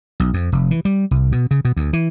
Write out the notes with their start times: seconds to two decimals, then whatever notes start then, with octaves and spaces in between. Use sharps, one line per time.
0.20 B1
0.34 F2
0.52 F1
0.71 E3
0.85 G3
1.11 C2
1.32 B2
1.51 C#3
1.65 B2
1.77 D2
1.93 E3